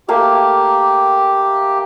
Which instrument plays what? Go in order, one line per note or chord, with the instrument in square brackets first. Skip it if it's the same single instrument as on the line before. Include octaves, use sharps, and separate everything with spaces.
[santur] A3 A#3 F5 [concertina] G4